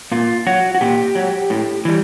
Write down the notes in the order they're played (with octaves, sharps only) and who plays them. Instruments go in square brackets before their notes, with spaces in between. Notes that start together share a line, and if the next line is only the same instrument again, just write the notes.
[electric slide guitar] A#2 F4
F#3 F#4
F#4
A#2 G4
F#3
A2
E3 G3